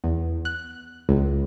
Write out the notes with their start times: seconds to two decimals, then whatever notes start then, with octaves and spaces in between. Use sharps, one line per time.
0.04 E2
0.45 F#6
1.09 C#2